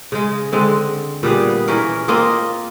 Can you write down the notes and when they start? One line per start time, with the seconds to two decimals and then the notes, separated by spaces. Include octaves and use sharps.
0.12 C#3 G#3
0.52 D3 G#3 C4
1.23 A#2 G3 B3 G#4
1.68 E3 C#4 A#4
2.08 A#3 C4 F4 D#5